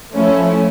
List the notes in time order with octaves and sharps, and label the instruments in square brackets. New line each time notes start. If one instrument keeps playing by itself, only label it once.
[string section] F3 A3 C#4 E4